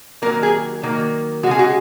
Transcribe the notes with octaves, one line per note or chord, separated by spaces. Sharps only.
D#3 F#3 A#3 A#4
G#4
D#3 F#3 A#3
C#3 G#3 F#4 G#4
F#4